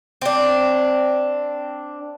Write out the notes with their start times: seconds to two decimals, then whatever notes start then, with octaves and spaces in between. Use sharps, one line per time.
0.22 C4 D4